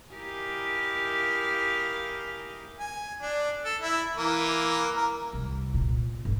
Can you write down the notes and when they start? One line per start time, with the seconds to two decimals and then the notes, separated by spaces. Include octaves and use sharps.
0.13 E4 G4 A#4 D#5 F5 G#5
2.79 G#5
3.22 D4
3.65 A4
3.82 E4
4.16 E3 A#3
4.96 A#4
5.33 C2
5.74 A#2
6.25 G#1 D3